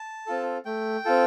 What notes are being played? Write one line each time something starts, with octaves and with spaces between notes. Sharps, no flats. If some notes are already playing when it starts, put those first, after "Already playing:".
Already playing: A5
C4 F4 A4
A3 G5
C4 F4 A4